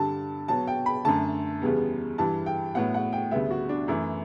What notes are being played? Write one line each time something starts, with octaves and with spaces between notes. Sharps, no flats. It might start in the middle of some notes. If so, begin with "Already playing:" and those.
Already playing: G2 D3 G3 A5
B2 F#3 B3 A5
G5
B5
F#2 D3 A3 A5
E2 C#3 G3 B3
G2 E3 G3 A5
G5
A2 F#3 B3 F#5
F#5
G5
D2 C#3 G3 B3 E5
F#4
D4
F#2 E3 A3 E4